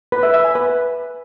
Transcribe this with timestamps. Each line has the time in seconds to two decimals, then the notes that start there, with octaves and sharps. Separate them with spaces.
0.12 B4
0.23 E5
0.34 E5
0.44 G#5
0.55 B4